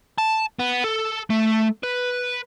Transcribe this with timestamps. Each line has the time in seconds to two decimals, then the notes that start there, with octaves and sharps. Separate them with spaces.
0.18 A5
0.59 B3
0.84 A4
1.30 A3
1.84 B4